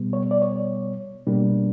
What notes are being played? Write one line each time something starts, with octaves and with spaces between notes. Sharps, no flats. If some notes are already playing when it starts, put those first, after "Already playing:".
Already playing: B2 G3 B3
C#5
D5
C#5
B2 G3 A#3 D4